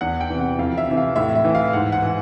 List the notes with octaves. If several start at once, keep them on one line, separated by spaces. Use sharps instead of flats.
E2 F#5
G5
C3 E3
F#5
F2 F5
E5
C3 E3
F5
A2 E5
E5
E3
F5
G#2 F#5
F#5
E3